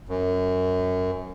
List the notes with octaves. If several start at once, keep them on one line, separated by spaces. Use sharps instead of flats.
F#2